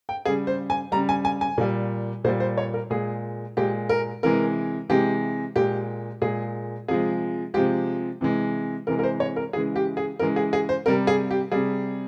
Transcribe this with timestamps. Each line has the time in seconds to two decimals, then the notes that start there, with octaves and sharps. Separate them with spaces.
0.09 G5
0.25 C#3 G3 G#4
0.47 C5
0.70 G#5
0.92 C#3 G3 A#5
1.09 G#5
1.25 G#5
1.41 G#5
1.58 A#2 G3
2.24 A#2 C5
2.28 G3
2.40 C5
2.58 C#5
2.74 A#4
2.90 A#2 G#3 G#4
3.57 A#2 G#3 G4
3.89 A#4
4.23 C3 E3 G#3 A#4
4.89 C3 E3 G#3 G4
5.56 A#2 G#3 G4
6.22 A#2 G#3 G#4
6.88 C3 F3 G#3 G#4
7.54 C3 F3 G#3 G4
8.21 C3 E3 G#3
8.87 C3 E3 G#3 A#4
8.99 A#4
9.04 C5
9.20 C#5
9.36 A#4
9.53 C#3 E3 G#3 G#4
9.76 G4
9.97 G#4
10.19 C#3 E3 G#3 A#4
10.36 G#4
10.53 G#4
10.69 C5
10.86 C3 G3 A#4
11.07 G#4
11.31 G4
11.52 C3 G3 G#4